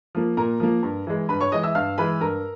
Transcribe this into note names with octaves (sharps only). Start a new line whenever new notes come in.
F3 A#3
A#2 A#4 A#5
F3 A#3
G2
E3 G#3
G2 B4 B5
C#5 C#6
E3 G#3 D#5 D#6
E5 E6
G2 F5 F6
E3 G#3 B4 B5
G2 A#4 A#5